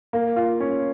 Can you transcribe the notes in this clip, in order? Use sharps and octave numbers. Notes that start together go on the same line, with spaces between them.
A#3
F4
C#4